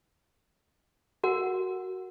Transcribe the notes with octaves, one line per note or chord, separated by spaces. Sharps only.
F#4 A#4 F#5